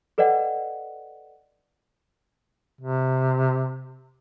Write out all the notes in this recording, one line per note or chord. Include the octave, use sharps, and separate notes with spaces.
A4 B4 D5 D#5 F#5 G5
C3